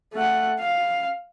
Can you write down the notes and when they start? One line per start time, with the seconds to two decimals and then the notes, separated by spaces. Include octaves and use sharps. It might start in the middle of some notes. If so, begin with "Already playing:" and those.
0.14 A3 F#5
0.60 F5